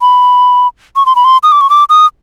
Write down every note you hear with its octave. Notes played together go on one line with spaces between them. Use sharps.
B5
C#6
C6
B5
C6
D#6
D6
C#6
D6
D#6